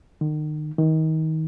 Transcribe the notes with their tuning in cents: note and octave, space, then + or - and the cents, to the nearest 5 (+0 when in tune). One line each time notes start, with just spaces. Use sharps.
D#3 -35
D#3 +30